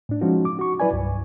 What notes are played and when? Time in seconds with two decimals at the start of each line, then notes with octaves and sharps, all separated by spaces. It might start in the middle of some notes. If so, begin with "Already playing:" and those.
0.09 A2 D4
0.21 F3 G#3 C#4 D#4 F#4
0.45 D6
0.59 F#4 C#6
0.80 F#3 E4 B4 D5 G#5
0.93 C2 G2